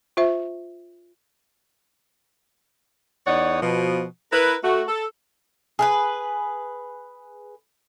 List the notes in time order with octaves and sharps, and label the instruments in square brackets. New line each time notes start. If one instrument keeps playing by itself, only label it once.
[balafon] F4 C5 E5
[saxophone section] E2 D#4 C#5 D5 F#5
B2 F3
E4 A#4 B4
A3 F#4
A4
[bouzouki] G#4 A#4 B4